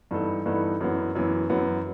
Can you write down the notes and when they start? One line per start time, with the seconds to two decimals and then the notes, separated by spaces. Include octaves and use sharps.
0.11 G2 E3 B3 D#4 A4
0.46 G2 E3 B3 D#4 A4
0.81 F#2 E3 B3
1.15 F#2 E3 B3
1.50 F#2 E3 B3